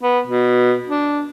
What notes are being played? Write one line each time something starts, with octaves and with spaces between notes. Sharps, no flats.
B3
B2
D4